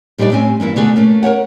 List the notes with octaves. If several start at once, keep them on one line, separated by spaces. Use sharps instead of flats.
A#2 G3 D4 D#4 D5
A2 C4 C#4 G#5
G2 E3 A#3 E4
B2 D3 A3 B3 D4 G#4
A3 A#3 C#4
A#4 C5 C#5 F#5